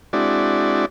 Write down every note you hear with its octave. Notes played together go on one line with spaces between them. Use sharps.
G#3 C4 D4 E4 F#4 D5